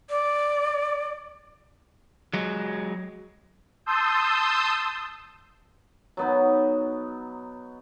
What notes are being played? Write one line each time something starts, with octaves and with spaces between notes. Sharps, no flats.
D5
F#3 G#3
A5 C6 D#6 E6 G6
F#3 B3 D#4